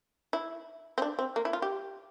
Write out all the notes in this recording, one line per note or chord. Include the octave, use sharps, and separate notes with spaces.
E4
C4
D4
C4
A#3
E4
F4
G4